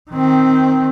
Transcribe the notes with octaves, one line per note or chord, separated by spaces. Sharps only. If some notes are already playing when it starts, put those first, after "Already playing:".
D#3 C4